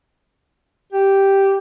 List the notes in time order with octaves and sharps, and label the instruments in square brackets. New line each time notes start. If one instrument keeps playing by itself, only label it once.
[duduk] G4